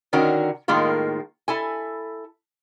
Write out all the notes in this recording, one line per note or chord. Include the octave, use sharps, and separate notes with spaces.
D3 D#3 C#4 F#4 A#4
A2 D#3 G#3 A#3 F4 A#4
E4 A4 G#5